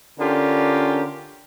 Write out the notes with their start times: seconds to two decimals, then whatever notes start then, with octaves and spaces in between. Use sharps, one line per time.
0.19 D3 C#4 D4 F4 G4 A#4